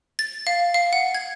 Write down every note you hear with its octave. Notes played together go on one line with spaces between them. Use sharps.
A6
F5
F5
F#5
G#6